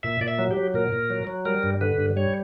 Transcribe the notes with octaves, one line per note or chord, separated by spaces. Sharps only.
A#2 E5
A#2 D5
E5
F#3
G4
F#3
A#2 A#4
A#2
F#3
F#3
G3 A#4
G2
D3 B4
G2
G3 C#5